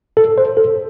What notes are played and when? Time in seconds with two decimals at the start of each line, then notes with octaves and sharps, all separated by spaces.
0.17 A4
0.38 C5
0.57 A4